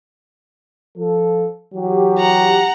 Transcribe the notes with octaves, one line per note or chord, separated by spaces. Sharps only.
F3 A4
E3 F#3 G4
F#5 A#5